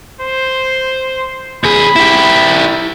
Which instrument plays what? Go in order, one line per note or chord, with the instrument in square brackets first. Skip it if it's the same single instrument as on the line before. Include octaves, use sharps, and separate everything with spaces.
[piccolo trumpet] C5
[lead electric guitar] D#2 G#4 [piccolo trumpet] B5
[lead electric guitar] E4 G4